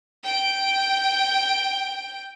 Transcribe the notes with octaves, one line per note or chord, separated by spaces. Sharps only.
G5 D7